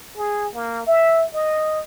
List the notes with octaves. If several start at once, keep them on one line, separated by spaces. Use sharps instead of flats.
G#4
A#3
E5
D#5